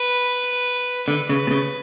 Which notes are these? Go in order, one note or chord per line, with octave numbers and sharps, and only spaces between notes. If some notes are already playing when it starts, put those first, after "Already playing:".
Already playing: B4
D3 B4
C#3
B2
C#3